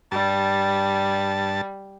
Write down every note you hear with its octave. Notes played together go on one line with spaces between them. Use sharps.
G2 G3 A5